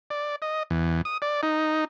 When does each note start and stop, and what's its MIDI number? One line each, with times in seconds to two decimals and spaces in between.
0.10 0.36 74
0.42 0.63 75
0.70 1.02 40
1.05 1.17 87
1.22 1.41 74
1.43 1.85 63